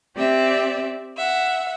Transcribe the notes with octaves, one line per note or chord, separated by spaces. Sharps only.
C4 G4 D5 E5
E5 F#5